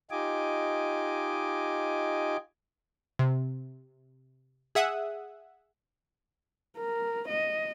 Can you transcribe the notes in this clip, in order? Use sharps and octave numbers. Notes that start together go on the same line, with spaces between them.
D#4 F4 G4 D#5 G#5 D6
C3
G#4 E5 F#5 D#6
A#4
D#5